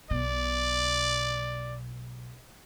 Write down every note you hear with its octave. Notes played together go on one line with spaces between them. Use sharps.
B1 B2 D5